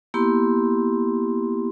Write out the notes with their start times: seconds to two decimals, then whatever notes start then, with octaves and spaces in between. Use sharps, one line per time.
0.14 A#3 B3 E4 G4 C6